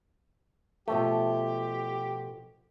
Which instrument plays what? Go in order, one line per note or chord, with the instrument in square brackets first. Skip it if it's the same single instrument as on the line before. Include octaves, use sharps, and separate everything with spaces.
[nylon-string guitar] B2 F3 G5 [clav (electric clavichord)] A3 [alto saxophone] G4